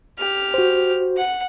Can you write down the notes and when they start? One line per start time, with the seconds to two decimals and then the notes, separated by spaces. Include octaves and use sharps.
0.18 G4 F6
0.54 F#4 C5
1.17 F#5